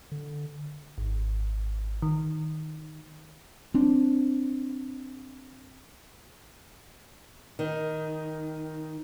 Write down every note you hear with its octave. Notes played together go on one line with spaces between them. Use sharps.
D3
G#1
D#3
C4 D4
D#3